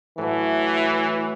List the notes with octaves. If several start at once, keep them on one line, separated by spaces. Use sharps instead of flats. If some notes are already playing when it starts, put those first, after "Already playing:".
A2 E3 F#3